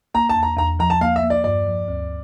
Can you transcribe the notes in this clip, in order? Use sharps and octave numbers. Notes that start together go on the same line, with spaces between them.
A#3 A#5
A5
E2
A#5
E2 A#5
F3 A#5
A5
A#3 F5
E5
A#3
D5
G2 D5
F3
D2